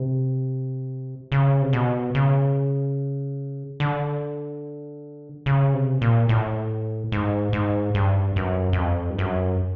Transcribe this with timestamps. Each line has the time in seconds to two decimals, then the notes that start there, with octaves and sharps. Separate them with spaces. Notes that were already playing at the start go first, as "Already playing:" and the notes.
Already playing: C3
1.32 C#3
1.62 C3
1.73 B2
2.15 C#3
3.80 D3
5.46 C#3
5.74 C3
6.02 A#2
6.29 A2
7.12 G#2
7.53 G#2
7.95 G2
8.36 F#2
8.73 F#2
8.77 F2
9.10 G2
9.18 F#2